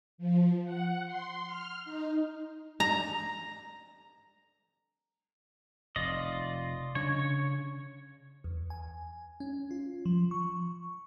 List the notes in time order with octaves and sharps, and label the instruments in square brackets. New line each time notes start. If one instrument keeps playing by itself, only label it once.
[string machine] F3
F#5
C6
F6
D#4
[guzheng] A#5
[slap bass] F1 [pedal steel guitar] F4 D5 D#5
[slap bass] C#3 D4 [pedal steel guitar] C#5
[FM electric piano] E2
G#5
C#4
F4
F3
C#6